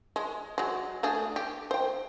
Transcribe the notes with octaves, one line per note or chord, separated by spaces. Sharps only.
G#3
F#3 G#3
A3 D4 G#4
G4
C5 G5